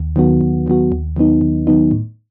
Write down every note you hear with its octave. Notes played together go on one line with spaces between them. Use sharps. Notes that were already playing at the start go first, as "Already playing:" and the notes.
Already playing: D#2
D#3 F#3 B3 F#4
D#2
D#3 F#3 B3 F#4
D#2
D#3 F#3 B3 D#4
D#2
D#3 F#3 B3 D#4
A2